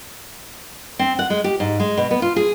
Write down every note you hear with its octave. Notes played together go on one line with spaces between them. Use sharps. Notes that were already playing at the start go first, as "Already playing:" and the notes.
C4
F#5
G#3
G4
G#2
G#3
B2
B3
F4
G#4